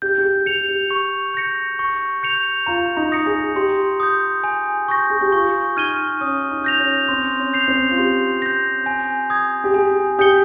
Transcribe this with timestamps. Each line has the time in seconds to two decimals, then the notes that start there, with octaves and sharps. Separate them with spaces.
0.02 G4 G6
0.18 G4
0.24 G#4
0.46 G4 C#7 F7
0.68 G4
0.91 C#6
1.34 G6 A#6 C#7
1.79 C#6
2.23 G6 C#7 F7
2.67 F4 A#5
2.97 D#4
3.12 D#6 A#6 C#7
3.26 G#4
3.56 G4 C6
4.00 D#6 G6
4.44 G#5
4.88 C#6 G6 A#6
5.10 G#4
5.21 G4
5.32 F4 C#6
5.76 D#4 F6 G#6 D#7 G7
6.20 C#4 D#6
6.51 D#4
6.64 G6 A#6 F7
6.79 C#4
7.09 C4 C6
7.39 C#4
7.53 G6 C7 F7
7.68 C4
7.90 F4
7.98 G4 C6
8.42 G6 A#6
8.86 G#5
9.30 D#6 G#6
9.64 G4
9.74 G#4 G#5
10.19 G4 D#6 G6 C#7 G7